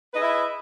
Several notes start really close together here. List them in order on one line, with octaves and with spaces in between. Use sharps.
B4 D#5 G#4 E5 E4